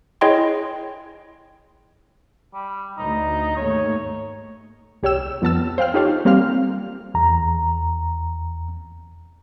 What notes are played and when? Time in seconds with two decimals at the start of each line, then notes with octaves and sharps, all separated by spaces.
0.21 E4 G#4 C#5 D#5 G5 C6
2.54 G3
2.98 D2 D#4
3.56 D#2 G#2 A3 C#5
5.03 C2 G4 C#5 G5 E6 E7
5.42 F2 B3 A5 E6
5.78 C5 F5 G5 F6
5.94 D#4 F4 G4 A4 C#5 F5
6.25 G3 A#3 C4 G4 F5 F6
7.14 E2 A#5